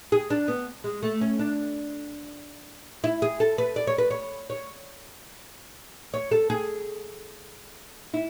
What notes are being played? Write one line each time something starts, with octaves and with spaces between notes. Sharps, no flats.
G#4
D4
B3
G#3
A3
C#4
D4
E4
G#4
A4
B4
D5
C#5
B4
C#5
C#5
C#5
A4
G#4
E4